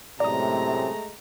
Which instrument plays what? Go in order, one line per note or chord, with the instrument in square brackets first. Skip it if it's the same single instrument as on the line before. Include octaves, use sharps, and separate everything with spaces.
[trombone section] F#2 A2 C3 [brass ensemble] G#3 A3 [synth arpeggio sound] D5 D#6 [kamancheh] A#5